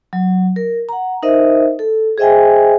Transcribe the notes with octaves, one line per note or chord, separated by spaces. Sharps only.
F#3
A#4
F#5 A#5
D#4 A#4 C5 D#5 E5
A4
G#4 C5 D#5 E5 G5 G#5